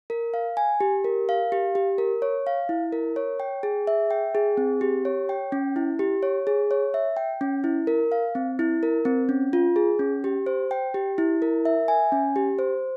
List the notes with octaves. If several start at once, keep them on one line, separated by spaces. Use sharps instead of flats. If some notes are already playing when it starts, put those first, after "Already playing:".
A#4
F5
G#5
G4
A#4
F5
G4
G4
A#4
C#5
F5
E4
A#4
C#5
G5
G#4
E5
G5
G#4
C4
G4
C#5
G5
C#4
E4
G4
C#5
G#4
C#5
E5
G5
C#4
E4
A#4
F5
C4
E4
A#4
C4
C#4
F4
G#4
C#4
G4
C5
G5
G4
E4
A#4
E5
G#5
C#4
G4
C5